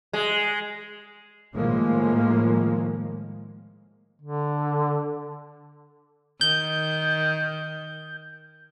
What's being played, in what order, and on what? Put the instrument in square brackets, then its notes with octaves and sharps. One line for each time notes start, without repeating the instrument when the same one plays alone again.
[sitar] G#3
[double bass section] A2 D#3 F3 G#3 A#3
[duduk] D3
[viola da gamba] D#3 [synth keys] G6